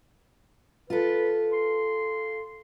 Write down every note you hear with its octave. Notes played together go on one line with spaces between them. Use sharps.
F4 A4 B4
C6